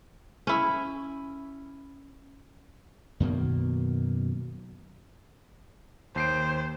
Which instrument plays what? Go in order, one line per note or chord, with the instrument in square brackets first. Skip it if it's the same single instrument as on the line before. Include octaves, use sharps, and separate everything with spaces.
[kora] C#4 E4
[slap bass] F#2 B2 D#3 A#3
[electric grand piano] D#2 C7 D7 [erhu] C5